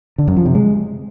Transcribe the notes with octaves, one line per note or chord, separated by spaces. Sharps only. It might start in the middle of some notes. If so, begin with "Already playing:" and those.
D3
F#2
F3
C3
G#3